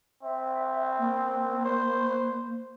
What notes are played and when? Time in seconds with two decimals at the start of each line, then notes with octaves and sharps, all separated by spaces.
0.23 C4 E5
0.99 A#3
1.64 C5